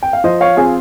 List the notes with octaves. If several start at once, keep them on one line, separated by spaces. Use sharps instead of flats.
G5
F5
F3 C5 D#5
C#5 F5
C4 F4 G#4